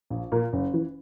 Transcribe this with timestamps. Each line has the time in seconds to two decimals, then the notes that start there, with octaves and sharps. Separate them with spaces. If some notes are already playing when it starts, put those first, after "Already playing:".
0.10 A#1
0.32 A#2 A#3
0.53 F#1
0.74 E3